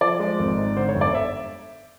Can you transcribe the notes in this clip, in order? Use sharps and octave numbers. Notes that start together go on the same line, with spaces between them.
F3 D5
G#3
G#1
G#2
D3 C5
C#5
G1
D5
E5